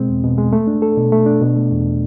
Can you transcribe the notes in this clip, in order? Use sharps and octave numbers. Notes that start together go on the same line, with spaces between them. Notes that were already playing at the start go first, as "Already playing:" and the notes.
Already playing: B2 G#3 C4
E2
B2
G#3
A3
D4
A4
B2
A3
D4
B2
A3
E2